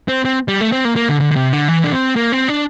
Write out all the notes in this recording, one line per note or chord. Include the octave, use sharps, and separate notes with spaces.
C4
C4
G3
A3
C4
A#3
A#3
D3
D3
D3
C3
D3
E3
D4
C4
A#3
C4
D4